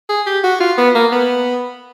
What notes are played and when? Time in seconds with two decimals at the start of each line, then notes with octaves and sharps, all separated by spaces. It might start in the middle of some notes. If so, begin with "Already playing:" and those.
0.09 G#4
0.27 G4
0.44 F#4
0.60 F4
0.78 B3
0.95 A#3
1.12 B3